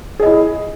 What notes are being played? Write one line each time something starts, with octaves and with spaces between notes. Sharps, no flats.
E4 G#4 D#5